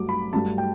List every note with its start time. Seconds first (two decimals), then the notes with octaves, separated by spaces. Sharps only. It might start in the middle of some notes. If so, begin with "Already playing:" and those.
Already playing: G2 F#3 A3 D6
0.09 B5
0.33 G2 F#3 A3 A5
0.58 G5